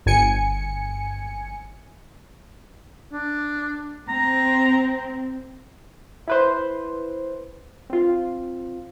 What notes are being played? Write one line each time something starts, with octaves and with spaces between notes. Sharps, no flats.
G1 G#5 C#7
D4
C4 A#5
E4 B4 C5
C4 F4